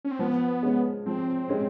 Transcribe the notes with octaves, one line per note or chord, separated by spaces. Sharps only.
C#4
C4
F3 B3
G#3 C#4
F3 C4
G#3 C#4